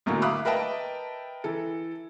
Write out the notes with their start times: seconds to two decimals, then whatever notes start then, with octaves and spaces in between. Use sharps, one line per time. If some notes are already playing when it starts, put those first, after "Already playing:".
0.06 B1 A2 D3 F#3 A#3
0.22 E5 F5 B5 D6 D#6 F#6
0.45 A#4 B4 D#5 E5 G5 A5
1.44 E3 A4